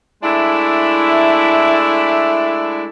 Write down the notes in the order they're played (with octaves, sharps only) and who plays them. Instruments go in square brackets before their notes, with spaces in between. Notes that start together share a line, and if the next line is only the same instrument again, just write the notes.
[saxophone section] G#3 A3 D4 E4